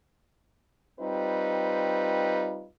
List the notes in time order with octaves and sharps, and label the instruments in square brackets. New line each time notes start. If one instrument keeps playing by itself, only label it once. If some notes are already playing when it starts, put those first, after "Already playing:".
[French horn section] G3 C4 D#4 F4 B4